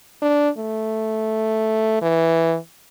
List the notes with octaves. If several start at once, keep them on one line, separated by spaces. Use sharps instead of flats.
D4
A3
E3